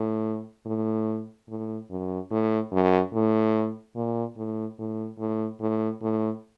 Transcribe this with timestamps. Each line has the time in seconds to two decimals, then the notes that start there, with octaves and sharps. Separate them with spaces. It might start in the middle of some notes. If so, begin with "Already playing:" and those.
Already playing: A2
0.66 A2
1.49 A2
1.90 F#2
2.31 A2
2.72 F#2
3.13 A2
3.96 A#2
4.37 A2
4.78 A2
5.19 A2
5.60 A2
6.02 A2